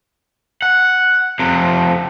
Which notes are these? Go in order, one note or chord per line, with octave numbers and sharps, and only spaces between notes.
F#5
F2 C3